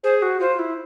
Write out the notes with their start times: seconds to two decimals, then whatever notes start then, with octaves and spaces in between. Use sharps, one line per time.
0.03 G#4 C5
0.22 F#4
0.40 F4 C5
0.59 E4